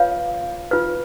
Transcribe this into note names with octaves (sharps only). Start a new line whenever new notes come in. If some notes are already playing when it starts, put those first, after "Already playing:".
Already playing: F4 B4 C#5 F5
F4 B4